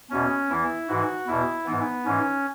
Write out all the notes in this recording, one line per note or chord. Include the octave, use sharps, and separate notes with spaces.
E2 B2 C#4
E2 E3 E4
G#2 E3 F#4
E2 B2 E4
G#2 E3 B3
G#2 E3 C#4